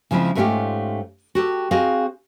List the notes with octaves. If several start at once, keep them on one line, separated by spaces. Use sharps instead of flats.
C#3 F3 G#3 C4 E4
G#2 A3 B3 C#4 F4 G4
F#4 G4 A4
C4 F#4 G#4 D#5 F5